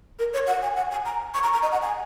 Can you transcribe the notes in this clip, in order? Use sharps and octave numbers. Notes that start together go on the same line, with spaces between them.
A#4
C#5
F#5
G#5
F#5
G#5
A#5
C#6
A#5
A#5
D#5
F#5
G#5